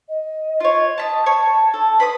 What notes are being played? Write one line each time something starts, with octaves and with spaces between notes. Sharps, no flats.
D#5
F4 C#5
A5 B5 D#6
C#5 A5
A4
B4 B5 C6 D#6